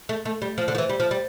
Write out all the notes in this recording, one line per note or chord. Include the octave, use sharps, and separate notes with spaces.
A3
A3
G3
F3
D3
F3
E3
G3
F3
G3